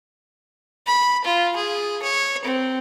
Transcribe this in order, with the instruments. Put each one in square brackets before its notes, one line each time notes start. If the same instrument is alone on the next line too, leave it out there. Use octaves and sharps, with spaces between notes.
[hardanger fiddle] B5
F4
G#4
C#5
C4